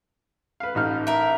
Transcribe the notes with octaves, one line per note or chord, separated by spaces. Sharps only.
B4 F5
A1 D#4 F6
A#4 E5